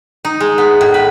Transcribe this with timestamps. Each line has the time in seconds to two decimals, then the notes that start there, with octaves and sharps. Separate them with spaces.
0.25 D#4
0.40 G#3
0.58 B3
0.81 A2
0.94 B4